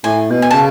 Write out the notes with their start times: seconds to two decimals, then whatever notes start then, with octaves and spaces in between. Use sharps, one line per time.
0.04 A2 G#5
0.30 B2
0.42 G#5
0.51 A5
0.54 C#3